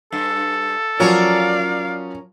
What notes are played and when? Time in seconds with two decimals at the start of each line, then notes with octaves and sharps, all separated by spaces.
0.12 G2 A4
1.00 F3 F#3 C#4 A#4 C#5 D5 F5